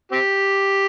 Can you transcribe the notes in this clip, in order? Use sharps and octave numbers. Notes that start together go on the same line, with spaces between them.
C4 G4